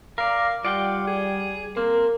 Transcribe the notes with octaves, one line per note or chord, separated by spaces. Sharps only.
A#4 D5 F5
G3 F4 D5 F#5 G5
G#4
A#3 C4 A#4